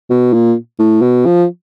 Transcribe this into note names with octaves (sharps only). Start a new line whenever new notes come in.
B2
A#2
A2
B2
F3